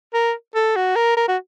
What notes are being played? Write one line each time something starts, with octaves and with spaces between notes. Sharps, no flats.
A#4
A4
F#4
A#4
A#4
F#4